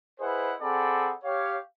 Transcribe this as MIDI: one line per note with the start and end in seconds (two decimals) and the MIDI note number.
0.19 0.53 64
0.19 0.53 68
0.19 0.53 71
0.19 0.53 72
0.19 0.53 75
0.19 0.53 78
0.61 1.12 60
0.61 1.12 68
0.61 1.12 69
0.61 1.12 74
0.61 1.12 78
0.61 1.12 83
1.24 1.57 67
1.24 1.57 73
1.24 1.57 77